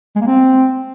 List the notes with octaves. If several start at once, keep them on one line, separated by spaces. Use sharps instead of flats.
G#3
A#3
C4